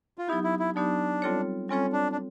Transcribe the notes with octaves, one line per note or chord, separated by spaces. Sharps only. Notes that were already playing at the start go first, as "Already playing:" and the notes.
F4
F#3 B3 D#4 E4 G4
E4
E4
F#3 B3 D4 D#4 G4
G3 C4 F4 A4 C#5
G3 C4 C#4 F4 A4 C#5
D4
D4